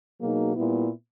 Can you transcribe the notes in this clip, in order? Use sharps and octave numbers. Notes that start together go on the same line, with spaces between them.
B2 F#3 A#3 D#4 G#4
A#2 G3 B3 E4